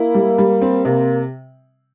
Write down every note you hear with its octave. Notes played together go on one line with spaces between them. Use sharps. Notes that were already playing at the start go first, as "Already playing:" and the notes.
Already playing: A#3 E4
G3
G3
C4
C3 A#3